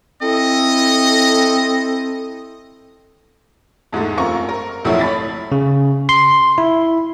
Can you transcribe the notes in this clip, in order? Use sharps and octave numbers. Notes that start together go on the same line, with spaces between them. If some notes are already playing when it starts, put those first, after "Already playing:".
C4 E4 A4 D#5
E2 G#2 G#3 A3
F#2 C4 F4 A#4 C#6
A#4
A#1 F2 F#3 A3 E4 C#5
C#5 B5 A6 B6
C#3
C6
E4